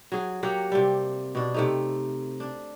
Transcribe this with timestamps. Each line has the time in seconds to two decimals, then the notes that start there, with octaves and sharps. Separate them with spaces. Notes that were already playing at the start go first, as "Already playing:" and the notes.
0.12 F#3 G#4
0.43 F#3 A#3 G4 F#5
0.72 C3 G3
1.35 B2 D4
1.54 C3 A3 D#4
2.40 D4